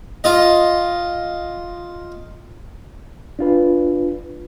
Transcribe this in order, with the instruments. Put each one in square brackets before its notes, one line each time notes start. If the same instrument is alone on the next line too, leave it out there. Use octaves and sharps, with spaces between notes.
[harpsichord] F4 D#5
[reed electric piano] D4 F4 B4